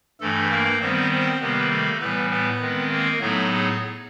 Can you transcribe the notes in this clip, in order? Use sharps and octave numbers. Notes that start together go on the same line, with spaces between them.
G2 E3 A3 A4
A#3 A#4
D#3 G3 B3 C4 C5
C4 C5
C3 D#3 G3 A#3 B3 B4
A3 A4
A2 E3 G3 B3 B4
B3 B4
D#3 G#3 C4
A#3 A#4
A2 F#3 A3 B3 D#4 A4
G#4